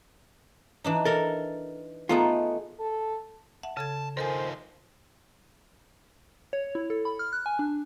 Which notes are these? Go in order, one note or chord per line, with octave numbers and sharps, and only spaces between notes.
E3 D4 D#4
A4 A#4
A3 B3 D#4 F4 G#4
A4
E5 F#5 A5
C#3 A4 A5 G#6
D#3 F3 A4 A#4 C5 G#5
C#5
E4
A4
B5
F6
F#6
G#5
D4